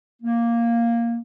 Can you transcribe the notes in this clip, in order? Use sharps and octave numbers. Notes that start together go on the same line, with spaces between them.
A#3